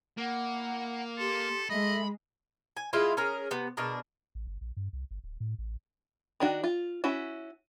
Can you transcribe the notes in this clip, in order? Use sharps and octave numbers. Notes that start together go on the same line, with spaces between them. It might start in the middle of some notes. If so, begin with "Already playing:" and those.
A#3 E4 F#5
G4 A4 C6
G#3 A4 D#5 E5 B5
G#5
G#3 E4 F4 B4
C#4 G#4 A#4
C3 B3
B2 D4 G#4 A#4
A1
G1
A#1
G2
C2
G1
D1
A2
A1
D#3 D4 F#4
F4
C#4 E4 F#4